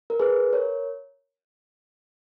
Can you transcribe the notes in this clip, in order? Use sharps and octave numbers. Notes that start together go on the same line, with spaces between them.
A#4
G#4 B4
A#4 C#5